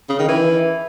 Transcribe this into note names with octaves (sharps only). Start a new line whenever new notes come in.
C#3
D#3
E3